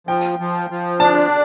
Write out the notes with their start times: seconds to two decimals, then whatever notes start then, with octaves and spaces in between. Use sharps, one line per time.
0.07 F3 G5
0.39 F3
0.70 F3
1.00 D4 A5